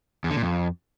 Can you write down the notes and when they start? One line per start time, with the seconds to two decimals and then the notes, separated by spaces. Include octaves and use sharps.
0.24 E2
0.30 D3
0.36 A#2
0.43 F2